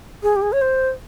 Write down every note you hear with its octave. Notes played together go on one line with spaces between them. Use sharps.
G#4
G4
G#4
C#5
C5